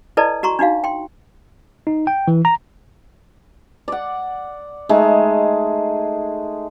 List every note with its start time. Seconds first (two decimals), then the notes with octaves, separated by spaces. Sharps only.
0.17 E4 A4 B4 D5 D#5 A5
0.43 F#4 A#5 C6 C#6
0.59 D4 D#4 F#4 F5
0.84 G5 C6
1.87 D#4
2.07 G5
2.28 E3
2.45 A#5
3.88 D5 F#5
4.89 G#3 A3 D#4